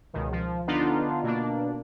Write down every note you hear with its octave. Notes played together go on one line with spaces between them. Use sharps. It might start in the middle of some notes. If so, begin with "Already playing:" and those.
C#2 B2 D#3
F3
D3 B3 D4 D#4 F4
B2 A#3 D4